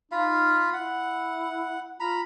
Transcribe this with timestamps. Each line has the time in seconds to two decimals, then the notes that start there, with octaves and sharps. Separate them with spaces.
0.12 D#4 F4 F5 B5
0.73 E4 F#5
2.00 F4 A#5 B5